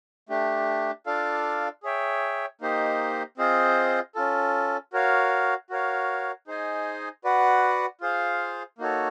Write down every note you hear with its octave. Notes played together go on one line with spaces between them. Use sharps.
A3 D4 G4
D4 F4 A4 D5 F5
G#4 C#5 E5 G5
A#3 D#4 G4 C5 D#5
C4 F4 G#4 C5 D#5
C#4 F4 A4
F#4 A#4 C#5 F5
F#4 A#4 C#5 F5
D#4 G#4 C5 D#5 G#5
F#4 B4 D5 F#5
F4 G#4 C5 F5
A#3 D#4 F#4 A4 C#5